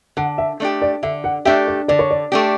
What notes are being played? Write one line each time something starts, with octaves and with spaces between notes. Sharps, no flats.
D3 F#5
E5
A3 D4 G4
D5
D3 E5
F#5
A3 D4 G4 E5
D5
D3 D5
C#5
D5
A3 D4 G4